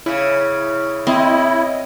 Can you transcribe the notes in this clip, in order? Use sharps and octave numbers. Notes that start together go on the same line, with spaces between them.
C#3 E4
C4 E4 D#5